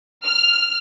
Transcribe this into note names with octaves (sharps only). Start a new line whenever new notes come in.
F6